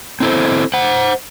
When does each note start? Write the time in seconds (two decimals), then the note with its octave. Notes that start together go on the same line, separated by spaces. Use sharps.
0.20 C4 E4 A4 C5
0.74 C5 F#5